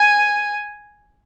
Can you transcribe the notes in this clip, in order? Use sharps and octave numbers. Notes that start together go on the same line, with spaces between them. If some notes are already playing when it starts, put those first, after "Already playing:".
Already playing: G#5